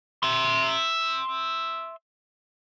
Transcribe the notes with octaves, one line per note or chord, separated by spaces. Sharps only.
E5 C6